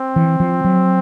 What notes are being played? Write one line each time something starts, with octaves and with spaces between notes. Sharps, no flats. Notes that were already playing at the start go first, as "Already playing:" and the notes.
Already playing: C4
E3
F3
F#3